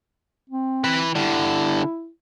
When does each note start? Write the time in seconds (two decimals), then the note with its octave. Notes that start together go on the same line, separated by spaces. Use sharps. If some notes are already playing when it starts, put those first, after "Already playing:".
0.50 C4
0.84 E3 B4
1.15 D3 G3 E4